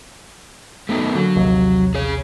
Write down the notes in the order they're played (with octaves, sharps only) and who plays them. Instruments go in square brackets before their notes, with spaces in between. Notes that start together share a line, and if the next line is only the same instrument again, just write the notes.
[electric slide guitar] A3 B3 D#4
[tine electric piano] D3 A#3 [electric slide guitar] F#3
[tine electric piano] A#1 D#2 C3
[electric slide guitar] G#4 C#5